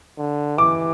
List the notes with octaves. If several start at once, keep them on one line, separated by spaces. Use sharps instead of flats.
D3
E3 D6